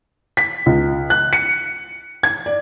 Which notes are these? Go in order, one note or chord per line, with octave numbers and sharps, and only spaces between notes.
B6
C#2
F#6
C#7
G#6
D5